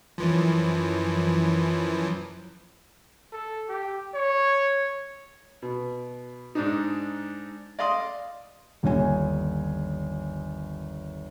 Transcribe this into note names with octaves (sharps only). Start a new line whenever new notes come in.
F#2 E3 F3
A4
G4
C#5
B2
G#2 D4 D#4
D5 D#5 F5 C6 D#6
G1 D#2 C#5 G#5